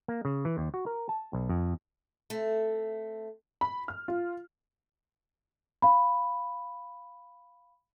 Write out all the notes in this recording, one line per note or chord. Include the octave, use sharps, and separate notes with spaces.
A#3
C#3
E3
D#2
F#4
A#4
A5
B1
F2
A3 C4
B5
F6
F4
F5 B5